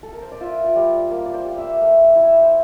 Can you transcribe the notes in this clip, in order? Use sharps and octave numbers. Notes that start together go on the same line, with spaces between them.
A4
A#4
C5
D5
F4 E5
D5
G3
A#3
D5
C5
G3
F5
E5
A3 F5
E5
E4 D5
E5
C5